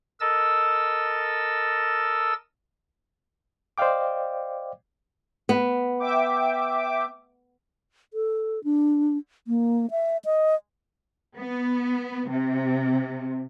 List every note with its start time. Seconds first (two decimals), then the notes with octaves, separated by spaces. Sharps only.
0.20 A4 A#4 D#5 E6 A6
3.78 C5 D5 D#5 F5 G5 D6
5.49 B3
6.00 E5 G5 D6
8.14 A4
8.64 D4
9.48 A#3
9.91 E5
10.25 D#5
11.37 B3
12.30 C3